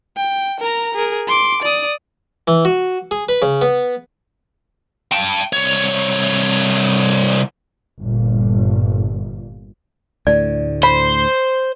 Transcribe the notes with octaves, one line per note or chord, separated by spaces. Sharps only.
G5
A#4 A#5
G#4 A#4
C6 D6
D5 D#6
E3
F#4
G#4
B4
C#3
B3
G5 A5
C2 C#5
G1 A#2
D2 A2 D5
C5 B5